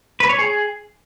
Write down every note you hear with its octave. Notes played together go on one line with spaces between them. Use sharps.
B4
C#5
G#4